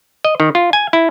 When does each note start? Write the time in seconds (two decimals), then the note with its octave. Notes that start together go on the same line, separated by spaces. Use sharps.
0.25 D#5
0.40 D#3
0.55 F4
0.73 G#5
0.93 E4